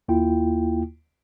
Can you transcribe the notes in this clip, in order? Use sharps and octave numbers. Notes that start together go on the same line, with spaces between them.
D#2 A#3 E4 F4 G5